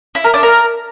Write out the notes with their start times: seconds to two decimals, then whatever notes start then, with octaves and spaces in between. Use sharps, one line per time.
0.15 E4
0.24 A#4
0.34 D4
0.43 A#4